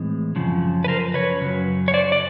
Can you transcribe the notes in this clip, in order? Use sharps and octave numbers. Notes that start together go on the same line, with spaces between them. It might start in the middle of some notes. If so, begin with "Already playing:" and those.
Already playing: A2 E3 G#3 C4
F#2 C#3 F3
B4
A#4 C5
B4 C#5
F#2 C#3 F#3
C#5
C5 D5
D5